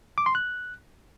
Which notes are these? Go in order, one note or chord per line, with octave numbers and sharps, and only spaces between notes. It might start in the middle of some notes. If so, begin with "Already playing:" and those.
D6
C6
F#6